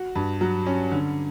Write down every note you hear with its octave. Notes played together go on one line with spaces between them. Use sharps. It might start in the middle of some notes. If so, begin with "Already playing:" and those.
Already playing: F#4
G2
F#3
C#4
D3